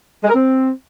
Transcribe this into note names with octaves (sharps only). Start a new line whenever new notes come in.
G#3
A#4
C4